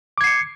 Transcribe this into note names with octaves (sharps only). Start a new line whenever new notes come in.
D6 G#6 C7 C#7